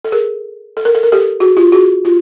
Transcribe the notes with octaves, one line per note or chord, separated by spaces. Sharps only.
A4
G#4 A#4
A4
A#4
A4
A#4
G4 A4
F#4 G#4
F4 G4
F#4 G#4
F4 G4